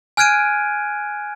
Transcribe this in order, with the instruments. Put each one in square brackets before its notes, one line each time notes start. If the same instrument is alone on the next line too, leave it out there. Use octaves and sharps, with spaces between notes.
[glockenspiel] G#5 F6 F#6 G#6 D7 D#7